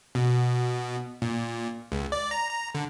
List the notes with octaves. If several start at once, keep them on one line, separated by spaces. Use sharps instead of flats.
B2
A#2
C#2
D5
A#5
A#5
D3